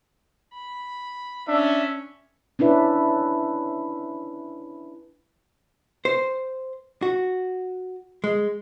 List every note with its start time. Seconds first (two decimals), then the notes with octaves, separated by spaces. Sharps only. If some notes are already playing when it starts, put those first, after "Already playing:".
0.54 B5
1.48 C#4 D4 E5
2.59 C#4 D4 E4 B4 E5
6.05 C5
7.02 F#4
8.24 G#3